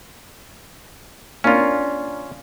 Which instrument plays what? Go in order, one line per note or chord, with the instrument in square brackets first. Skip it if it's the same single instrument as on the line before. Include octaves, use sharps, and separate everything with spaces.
[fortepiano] A#3 D4 [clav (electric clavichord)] C#4 F4